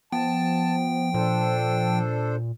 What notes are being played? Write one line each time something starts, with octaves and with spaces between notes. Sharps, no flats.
F3 B3 G5 A5
A#2 D4 A4 C5